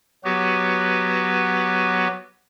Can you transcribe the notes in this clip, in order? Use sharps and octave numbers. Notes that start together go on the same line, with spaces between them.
F#3 B3 F#4 G4 B4